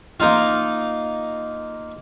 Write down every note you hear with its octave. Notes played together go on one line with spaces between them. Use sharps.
A#3 D#4 F4